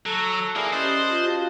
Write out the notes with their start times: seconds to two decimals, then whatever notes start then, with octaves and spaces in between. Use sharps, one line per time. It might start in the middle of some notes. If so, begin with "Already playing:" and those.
0.06 F#3 A4 F#6
0.56 A#3 E4 G#4 D5 F5
0.72 C#4 G4 C5 D#5 A5 F#6
1.10 F4 G4
1.25 F#4 G4 F5